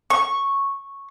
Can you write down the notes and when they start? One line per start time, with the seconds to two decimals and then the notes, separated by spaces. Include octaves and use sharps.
0.10 C#6